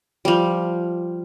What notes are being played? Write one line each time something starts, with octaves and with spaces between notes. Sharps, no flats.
F3 G3